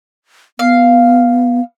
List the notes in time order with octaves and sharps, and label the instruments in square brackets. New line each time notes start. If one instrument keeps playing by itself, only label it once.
[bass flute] B3 [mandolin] F5